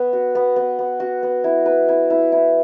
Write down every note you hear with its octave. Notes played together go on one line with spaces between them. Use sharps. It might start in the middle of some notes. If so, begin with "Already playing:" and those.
Already playing: B3 B4
F#4
B3
B3
B3
F#4
B3
E4
B4
E4
E4
E4